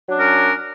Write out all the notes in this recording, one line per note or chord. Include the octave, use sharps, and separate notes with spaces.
F#3 C#4 D4 A#4